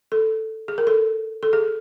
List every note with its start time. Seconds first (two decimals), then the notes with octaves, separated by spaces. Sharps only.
0.12 A4
0.68 G#4
0.78 A#4
0.87 A4
1.43 A4
1.53 G#4